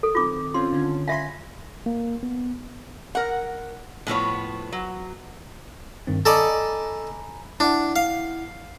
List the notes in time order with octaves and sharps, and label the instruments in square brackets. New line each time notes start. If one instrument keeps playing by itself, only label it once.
[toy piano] A4
[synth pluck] D#3 C4 [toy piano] F4 D6
[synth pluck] C4 C#4 F4 [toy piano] C6
[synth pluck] D3 C#4
[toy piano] E5 F5 [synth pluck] G#5 B5 C6
[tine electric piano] A#3
B3
[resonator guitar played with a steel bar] A#4 F#5
A2 F3 B3 C#5
F#3
[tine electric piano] G2 D#3 C4
[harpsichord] A4 D5 D#5 [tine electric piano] G#5 A#5 B5
[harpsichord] D4 [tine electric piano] E4 F#5
[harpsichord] F5